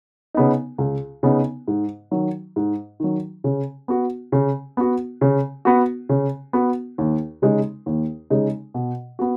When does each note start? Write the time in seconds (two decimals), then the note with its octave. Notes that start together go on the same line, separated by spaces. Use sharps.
0.34 C#3 B3 D#4
0.78 C#2
1.23 C#3 B3 D#4
1.68 G#2
2.11 D#3 F#3
2.56 G#2
3.00 D#3 F#3
3.44 C#3
3.88 B3 F#4
4.32 C#3
4.77 B3 F#4
5.21 C#3
5.65 B3 F#4
6.09 C#3
6.53 B3 F#4
6.98 D#2
7.42 C#3 G#3 D#4
7.86 D#2
8.30 C#3 G#3 D#4
8.74 B2
9.19 B3 F#4